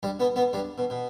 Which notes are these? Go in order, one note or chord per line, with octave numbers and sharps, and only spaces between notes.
G2 G3
B2 B3
B2 B3
G2 G3
B2
B2